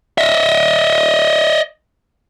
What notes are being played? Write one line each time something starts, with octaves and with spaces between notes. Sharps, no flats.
D#5 E5